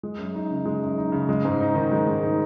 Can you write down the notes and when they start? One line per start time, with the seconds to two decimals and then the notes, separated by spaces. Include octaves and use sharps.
0.03 G#3
0.18 F#2
0.35 D#4
0.50 C#3
0.65 G#3
0.82 F#2
0.98 D#4
1.12 C#3
1.29 G#3
1.45 G#2
1.60 D#4
1.75 D#3
1.92 G#3
2.07 G#2
2.23 D#4